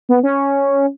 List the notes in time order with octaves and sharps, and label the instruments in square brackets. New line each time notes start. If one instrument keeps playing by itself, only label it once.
[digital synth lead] B3
C#4